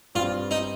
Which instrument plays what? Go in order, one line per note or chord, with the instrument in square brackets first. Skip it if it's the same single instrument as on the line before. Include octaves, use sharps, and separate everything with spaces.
[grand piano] G2 G3 C4 [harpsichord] F4
[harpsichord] D#4